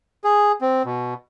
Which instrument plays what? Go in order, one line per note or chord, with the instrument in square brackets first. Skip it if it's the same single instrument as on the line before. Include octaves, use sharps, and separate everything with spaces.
[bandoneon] G#4
C4
B2